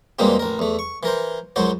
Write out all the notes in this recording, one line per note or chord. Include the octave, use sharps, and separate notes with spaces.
E2 B2 G3 G#3 A#3 C4
A1 A#4
E2 A3
C#6
E3 A#4 C5
C#2 F#2 F#3 F#4 C5